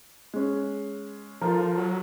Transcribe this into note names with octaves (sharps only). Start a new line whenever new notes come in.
G#3 C#4
F3 F4 A4 A#4
F#3